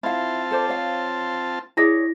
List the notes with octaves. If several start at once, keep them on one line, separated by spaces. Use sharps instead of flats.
C4 E4 F4 F5 A5
A4 C5 D5
C#5 F5
E4 G#4 C#5 D5 A#6